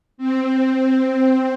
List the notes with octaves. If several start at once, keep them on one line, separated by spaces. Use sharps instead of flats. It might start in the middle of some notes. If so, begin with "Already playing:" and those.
C4